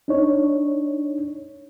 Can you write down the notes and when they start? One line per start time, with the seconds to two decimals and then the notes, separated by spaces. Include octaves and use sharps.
0.08 D4 D#4 C#5